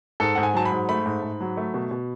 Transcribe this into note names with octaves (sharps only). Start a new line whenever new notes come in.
G#2 A4
G#2 F#5
G#5
F#3 A5
B5
G#2
A3 B5
G#2
G#2
F#3
A3
B2
B2